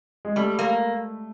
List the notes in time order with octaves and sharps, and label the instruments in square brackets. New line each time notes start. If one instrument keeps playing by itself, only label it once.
[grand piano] G#3
[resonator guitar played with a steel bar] G3 [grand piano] A3
[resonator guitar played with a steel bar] A#3